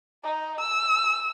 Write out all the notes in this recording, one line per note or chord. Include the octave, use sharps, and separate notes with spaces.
D#4
E6